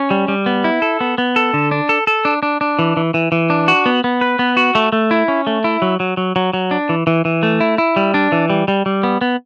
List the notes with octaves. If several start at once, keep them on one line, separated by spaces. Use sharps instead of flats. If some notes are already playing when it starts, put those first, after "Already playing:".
Already playing: C#4
G3
G3
B3
E4
A4
B3
B3
A4
D3
D4
A4
A4
D4
D4
D4
E3
E3
E3
E3
D4
F#4
B3
B3
B4
B3
F#4
A3
A3
E4
C#4
A3
E4
F#3
F#3
F#3
F#3
F#3
D4
E3
E3
E3
A3
E4
E4
G3
D4
E3
G3
G3
G3
B3
B3